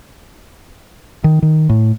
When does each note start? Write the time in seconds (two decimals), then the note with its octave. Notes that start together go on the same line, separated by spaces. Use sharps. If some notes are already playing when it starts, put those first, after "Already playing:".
1.24 D#3
1.42 D#3
1.69 A2